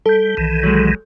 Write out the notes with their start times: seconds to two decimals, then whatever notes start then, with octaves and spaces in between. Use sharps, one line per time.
0.06 G3 A4 G6
0.37 B1 D#3 E3
0.63 F#3 G#3